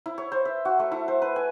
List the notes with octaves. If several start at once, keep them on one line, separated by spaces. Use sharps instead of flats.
E4
C#5
C5
E5
F#4
A3
E4
C5
B4
G#5